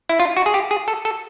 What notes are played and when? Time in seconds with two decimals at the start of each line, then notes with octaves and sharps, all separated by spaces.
0.09 E4
0.20 F4
0.37 F#4
0.46 G#4
0.54 G4
0.71 G#4
0.88 A4
1.05 A4